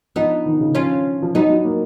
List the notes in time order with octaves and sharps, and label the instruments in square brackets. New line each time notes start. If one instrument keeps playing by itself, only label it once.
[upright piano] F3 [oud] B3 D#4
[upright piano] D#3
C#3
[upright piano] F3 [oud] C#4 F4
[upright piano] F3
[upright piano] F#3 [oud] B3 D#4
[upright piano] F#3
A#3